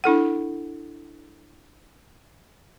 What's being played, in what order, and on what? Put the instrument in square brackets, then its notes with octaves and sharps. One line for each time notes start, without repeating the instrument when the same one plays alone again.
[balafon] D4 E4 A4 F#5